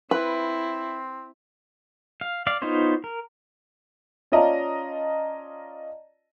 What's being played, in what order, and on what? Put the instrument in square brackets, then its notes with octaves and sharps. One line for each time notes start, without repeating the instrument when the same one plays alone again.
[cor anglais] C4 [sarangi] E4 [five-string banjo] B4
[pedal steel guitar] F5
D5 F5
B3 D#4 F4 C5 C#5
A#4
[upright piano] C#4 F4 D5 D#5 A5 A#5